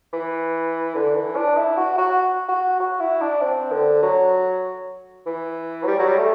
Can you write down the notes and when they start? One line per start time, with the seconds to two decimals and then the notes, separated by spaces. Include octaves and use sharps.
0.13 E3
0.95 D3
1.16 E3
1.36 D4
1.57 E4
1.77 F#4
1.98 F#4
2.49 F#4
2.80 F#4
3.00 E4
3.21 D4
3.41 C4
3.72 D3
4.03 F#3
5.26 E3
5.83 F#3
5.87 G3
5.99 F#3
6.09 G3
6.18 A3